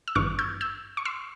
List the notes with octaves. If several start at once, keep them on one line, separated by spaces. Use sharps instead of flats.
E6
G#1 G2 E3 C#6 F6
E6 G6
E6 G6
C#6
C6 E6